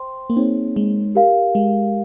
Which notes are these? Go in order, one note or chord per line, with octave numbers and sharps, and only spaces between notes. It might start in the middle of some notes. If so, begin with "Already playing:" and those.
Already playing: C5 G5 C6
A#3
C4 D#4 G#4 C#5
G#3
G4 A#4 F5
G#3